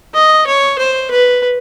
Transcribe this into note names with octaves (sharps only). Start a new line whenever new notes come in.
D#5
C#5
C5
B4